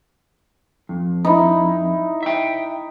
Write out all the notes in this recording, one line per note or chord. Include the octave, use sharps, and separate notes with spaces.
F2
D#4 E4
E5 G5